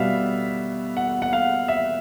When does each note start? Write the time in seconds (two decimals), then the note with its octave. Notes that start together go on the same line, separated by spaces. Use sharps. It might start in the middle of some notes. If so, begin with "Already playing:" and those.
Already playing: B2 G3 B3 E5 F5
0.97 F#5
1.22 F#5
1.33 F5
1.68 E5